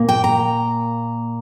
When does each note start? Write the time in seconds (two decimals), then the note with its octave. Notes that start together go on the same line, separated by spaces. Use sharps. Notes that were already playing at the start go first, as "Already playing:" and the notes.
Already playing: A#2 A#3
0.09 G5
0.24 A#5